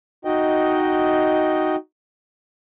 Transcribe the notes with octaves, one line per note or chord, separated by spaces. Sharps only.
D#4 F#4 D#5 G5